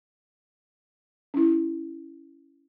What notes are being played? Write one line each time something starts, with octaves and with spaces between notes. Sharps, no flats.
C#4 E4